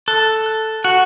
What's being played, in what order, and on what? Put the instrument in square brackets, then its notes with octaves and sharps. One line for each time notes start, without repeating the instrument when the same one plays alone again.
[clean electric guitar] A4 [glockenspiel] F#6
[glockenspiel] F#6
[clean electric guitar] F#4 [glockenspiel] F#6